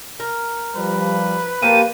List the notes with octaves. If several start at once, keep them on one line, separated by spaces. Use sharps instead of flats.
A#4
F3 G3 B4
F3 A#3 G4 D#7